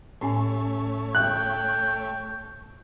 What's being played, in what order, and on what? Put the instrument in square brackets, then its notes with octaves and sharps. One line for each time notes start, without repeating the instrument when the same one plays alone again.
[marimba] A2 C#4 G#5 [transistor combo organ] A3 C#5
[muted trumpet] G5 [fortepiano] F#6